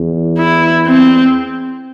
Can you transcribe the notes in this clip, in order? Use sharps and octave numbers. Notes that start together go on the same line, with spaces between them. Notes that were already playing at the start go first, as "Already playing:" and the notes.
Already playing: E2
E4
C4